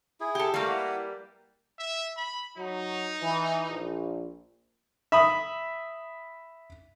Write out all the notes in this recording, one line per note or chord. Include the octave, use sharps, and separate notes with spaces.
E4 G#4
G4 A4
G3 A3 A#3 F5
E4 B4 F#5
E5
B5
F#3 D#4
E3
A#1
E5 B5 D#6